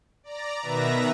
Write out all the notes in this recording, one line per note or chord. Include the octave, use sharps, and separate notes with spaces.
D5 A#5
B2 D#3 B4 E5 A#5 A#6